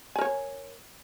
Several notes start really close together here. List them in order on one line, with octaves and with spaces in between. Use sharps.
G#5 A#4 C#5